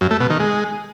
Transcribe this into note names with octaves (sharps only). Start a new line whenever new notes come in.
F#2
A3
B2
D#3
G#3